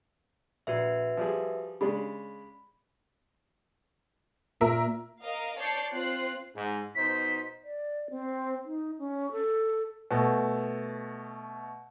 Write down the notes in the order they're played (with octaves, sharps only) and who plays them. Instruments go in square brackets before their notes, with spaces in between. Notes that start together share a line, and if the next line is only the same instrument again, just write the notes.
[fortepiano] A#1 [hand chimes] F#4 B4 E5
[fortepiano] F3 G3 G#4
[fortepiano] C#3 G#3 D4 [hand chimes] B5
[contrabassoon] A#2 [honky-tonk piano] A#4 E5
[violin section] A#4 D#5 F5
C#5 D5 A5 G6 C7 C#7
C4 F4 C5 F#6 C7
[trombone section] G#2
[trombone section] B2 D#4 C5 [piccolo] B6
[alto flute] D5
C4
D#4
C#4
A4
[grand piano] B2 A3